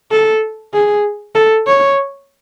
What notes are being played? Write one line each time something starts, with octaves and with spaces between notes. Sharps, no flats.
A4
G#4
A4
C#5